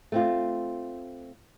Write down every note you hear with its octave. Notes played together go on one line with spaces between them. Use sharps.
A3 C4 F4